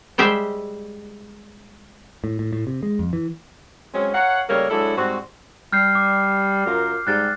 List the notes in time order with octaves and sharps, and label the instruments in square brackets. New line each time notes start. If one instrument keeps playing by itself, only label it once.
[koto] G3 G#3 G4 C5 E5 G5
[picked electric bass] A2
A2
A2
C3
G#3
F2
E3
[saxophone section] F#3 G#3 C4 C#4
A#4 C#5 F5 F#5
C#3 G3 A3 A#3 A#4 C#5
F#3 G#3 D4 E4 A4
G#2 G3 C4 F#4
[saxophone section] G3 [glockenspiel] F6 G6 C7
[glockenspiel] D6
[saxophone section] F#2 F4 A#4
[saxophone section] G#2 G3 G4 [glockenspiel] F#6 A6